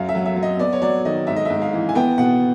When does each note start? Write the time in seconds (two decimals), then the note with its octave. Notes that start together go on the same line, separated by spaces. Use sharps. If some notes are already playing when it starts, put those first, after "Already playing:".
Already playing: F#2 F5
0.09 E5
0.15 F#3
0.26 E5
0.36 F#3
0.43 D#5
0.60 B3 D5
0.73 C#5
0.82 F#3 D5
1.05 D#3 D#5
1.27 G#2 E5
1.36 D#5
1.45 G#2 E5
1.62 F5
1.73 E3
1.89 G#5
1.95 B3 G5
2.18 B2 F#5